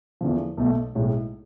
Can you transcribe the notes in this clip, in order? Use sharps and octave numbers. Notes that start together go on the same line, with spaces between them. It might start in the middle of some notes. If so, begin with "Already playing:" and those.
E2 D3 F3
B1 B2 A3
B1 A2 G#3